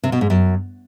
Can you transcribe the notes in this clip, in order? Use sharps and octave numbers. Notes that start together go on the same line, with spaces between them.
C3
B2
G#2
F#2